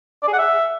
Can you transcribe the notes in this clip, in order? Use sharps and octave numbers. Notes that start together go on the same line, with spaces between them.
D5
G#4
F#5
E5